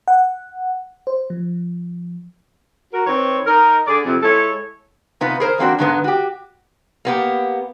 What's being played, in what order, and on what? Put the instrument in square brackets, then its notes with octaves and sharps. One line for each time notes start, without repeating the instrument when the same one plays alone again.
[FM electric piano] F#5
C5
F3
[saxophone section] F#4 A#4
D#3 C4 B4 C#5
D#4 A#4
D3 G#4 D5
F2 C3
G#3 E4 A4 C#5
[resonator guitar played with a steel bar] C3 B3 D#4 F4 B4
G#4 A#4 C5
E3 A#3 C4 D4 F#4
G2 D3 D#3 G#3 B3
F#4 G4
A#3 B3 G4